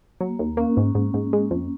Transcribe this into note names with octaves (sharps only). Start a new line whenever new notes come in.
F#3 A#3
D#2
A#3 C#4
G#2
G#2
G#2
G#3
F2